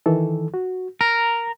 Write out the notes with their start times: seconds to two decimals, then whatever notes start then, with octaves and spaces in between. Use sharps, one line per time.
0.06 D#3 E3 A4
0.54 F#4
1.01 A#4 A#5